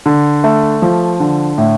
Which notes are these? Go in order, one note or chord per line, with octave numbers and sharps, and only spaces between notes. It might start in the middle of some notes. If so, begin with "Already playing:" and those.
D3
A3
F3
D3
A2